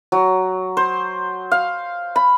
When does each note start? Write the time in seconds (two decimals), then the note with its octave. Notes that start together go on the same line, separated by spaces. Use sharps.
0.12 F#3
0.77 C5
1.51 F5
2.16 B5